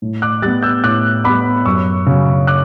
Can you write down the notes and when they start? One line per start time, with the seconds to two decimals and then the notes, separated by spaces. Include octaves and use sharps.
0.02 A2
0.22 D6 F#6
0.42 G3 B3 F#6 A6
0.63 E6 G6
0.84 A2 D6 F#6
1.24 G3 B3 B5 D6
1.65 F#2 C#6 E6
2.06 C#3 F#3
2.47 D6 F#6